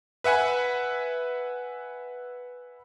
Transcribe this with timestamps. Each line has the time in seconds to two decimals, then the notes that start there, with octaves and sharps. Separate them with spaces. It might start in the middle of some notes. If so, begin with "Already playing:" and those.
0.24 B4 E5 F#5 G#5 B5